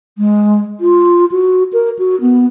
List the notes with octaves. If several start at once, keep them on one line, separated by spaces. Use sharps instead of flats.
G#3
F4
F#4
A#4
F#4
B3